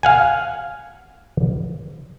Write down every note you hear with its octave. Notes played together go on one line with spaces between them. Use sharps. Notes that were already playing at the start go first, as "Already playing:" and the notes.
F5 F#5 G#5